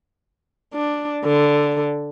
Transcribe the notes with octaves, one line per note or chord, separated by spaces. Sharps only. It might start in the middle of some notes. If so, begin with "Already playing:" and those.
D4
D3